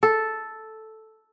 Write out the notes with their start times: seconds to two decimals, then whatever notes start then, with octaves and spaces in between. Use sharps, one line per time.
0.03 A4